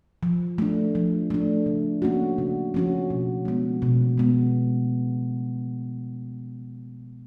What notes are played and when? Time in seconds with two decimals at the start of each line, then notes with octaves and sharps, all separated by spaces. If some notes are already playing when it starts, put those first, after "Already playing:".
0.23 F3
0.58 A3 D4
0.95 F3
1.30 A3 D4
1.66 C#3
2.02 F3 A#3 C#4 F#4
2.38 C#3
2.74 F3 A#3 C#4 F#4
3.10 B2
3.45 G#3 B3
3.82 B2
4.18 G#3 B3